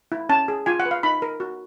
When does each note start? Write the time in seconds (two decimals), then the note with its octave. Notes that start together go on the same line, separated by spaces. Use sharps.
0.12 E4
0.29 C#4 A5
0.48 G#4
0.66 F4 G#5
0.80 F#5
0.86 B4
0.91 F5
1.03 D#4 B5
1.22 A#4
1.40 F#4